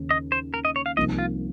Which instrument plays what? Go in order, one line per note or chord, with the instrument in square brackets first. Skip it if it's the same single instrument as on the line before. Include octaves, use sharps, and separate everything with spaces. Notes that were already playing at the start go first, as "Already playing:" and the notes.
Already playing: [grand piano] D#2 C#3 C#4
[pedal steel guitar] D#5
C5
A#4
D#5
C#5
F5
[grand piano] C2 C3 F3 A#3 D#4 [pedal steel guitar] D#5
[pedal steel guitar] F4